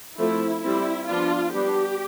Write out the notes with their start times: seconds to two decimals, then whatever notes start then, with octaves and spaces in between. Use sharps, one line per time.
0.19 F3 A3 C4 E4
0.64 G3 C4 E4
1.09 F3 B3 D4 F4
1.53 G3 B3 D4 G4